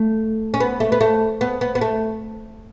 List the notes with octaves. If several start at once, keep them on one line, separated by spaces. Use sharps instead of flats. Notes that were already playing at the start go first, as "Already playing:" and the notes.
Already playing: A3
C#4
B3
A3
B3
A3
B3
B3
B3
A3